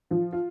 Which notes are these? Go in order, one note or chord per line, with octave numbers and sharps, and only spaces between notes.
F3 F4
F4